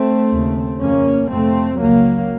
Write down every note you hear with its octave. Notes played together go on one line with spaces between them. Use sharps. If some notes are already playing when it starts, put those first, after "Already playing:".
Already playing: A3 C4
D#2 C#3
F2 C#3 A#3 C#4
F2 C3 A3 C4
C#2 C#3 F#3 A#3